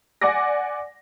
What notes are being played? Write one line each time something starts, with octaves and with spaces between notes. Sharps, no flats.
D5 F#5 G#5 D6 A#6